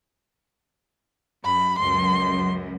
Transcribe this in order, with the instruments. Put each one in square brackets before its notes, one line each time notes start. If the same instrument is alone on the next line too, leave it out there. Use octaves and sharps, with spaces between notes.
[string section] F#2 [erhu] B5
[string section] C#2 F#2 [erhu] C6